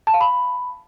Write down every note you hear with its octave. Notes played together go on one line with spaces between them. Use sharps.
A5
F5
B5